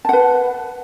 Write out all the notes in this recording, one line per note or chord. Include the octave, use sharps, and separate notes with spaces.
B4 F#5 A5